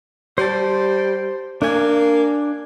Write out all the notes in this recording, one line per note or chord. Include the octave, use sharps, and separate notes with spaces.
G3 C5 A5
A#3 D4 G#5